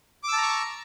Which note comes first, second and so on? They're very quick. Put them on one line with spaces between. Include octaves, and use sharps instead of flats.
D6 E6 A5 A#5 C#6